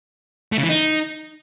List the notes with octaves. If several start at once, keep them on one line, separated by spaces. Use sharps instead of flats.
A3
C#3
E3
D#4